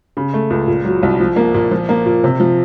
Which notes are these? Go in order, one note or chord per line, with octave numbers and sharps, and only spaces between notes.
C#3
A3
C#2
A#2
F#3
C2
F3
A#3
A#2
F3
A#3
A#2
C3
F3